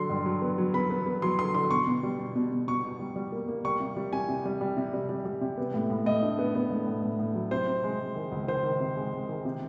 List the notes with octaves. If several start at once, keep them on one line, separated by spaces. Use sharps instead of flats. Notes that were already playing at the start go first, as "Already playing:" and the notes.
Already playing: D3 F#3 C6
G2
F#3
B3
F#3
B3 B5
B3
B3
F#3 C6
D3 C6
D3 C6
B2 C#6
B2
G3
B2
B2
B2
B2 C#6
B2
G3
G3
A#3
A#3
G3 C#6
C3
G3
C3 G#5
C3
G3
G3
C3
G3
G3
G3
C3
B3
A2
A2
A2 D#5
D4
B3
B3
A2
A2
A2
A2
F#3
C3 C5
C3
G#3
G#3
D#3
C#2
D#3 C5
D#3
C3
G#3
G#3
D#3
C3